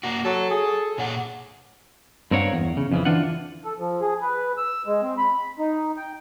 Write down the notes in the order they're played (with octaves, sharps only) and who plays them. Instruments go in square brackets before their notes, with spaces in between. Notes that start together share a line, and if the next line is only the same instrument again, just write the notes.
[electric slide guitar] A#3 F#4
[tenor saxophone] F#3 [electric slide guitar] A4
[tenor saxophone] G#4
[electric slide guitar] A#2 C#5 F#5
[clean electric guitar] G2 C4 A#4 C#5 F5 F#5
E2
C#3
F2 C#3 E3
E3 D4 F4 F#5
[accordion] A4
F3
G#4
B4
E6
G#3
C4
B5
D#4
G5